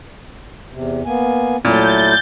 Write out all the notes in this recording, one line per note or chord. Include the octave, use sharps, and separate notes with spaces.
E2 C3
A#3 B3 G#5
A#2 F#3 A3 E4 G6 A6